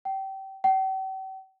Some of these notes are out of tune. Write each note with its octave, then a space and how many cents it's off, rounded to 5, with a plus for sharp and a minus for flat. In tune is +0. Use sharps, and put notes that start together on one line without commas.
G5 -25
G5 -45